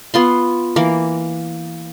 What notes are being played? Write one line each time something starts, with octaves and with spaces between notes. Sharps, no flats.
B3 F4 C6
E3 A#3